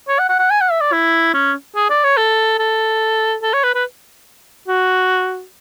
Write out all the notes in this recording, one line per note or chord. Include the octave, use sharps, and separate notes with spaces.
C#5
F#5
F#5
F#5
G#5
F#5
E5
D5
E4
C#4
G#4
D5
C#5
A4
A4
A4
C#5
B4
B4
F#4